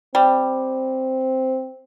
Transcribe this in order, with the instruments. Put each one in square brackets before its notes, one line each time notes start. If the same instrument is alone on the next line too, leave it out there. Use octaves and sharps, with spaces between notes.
[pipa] G3 [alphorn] C4